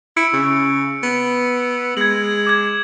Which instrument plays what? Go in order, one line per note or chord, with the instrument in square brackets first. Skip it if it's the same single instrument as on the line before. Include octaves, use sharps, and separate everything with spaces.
[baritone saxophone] E4 [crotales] E6 C#7 D7
[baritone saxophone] C#3
B3
[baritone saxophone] G#3 [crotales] G#6 F#7
[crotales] D6 G#6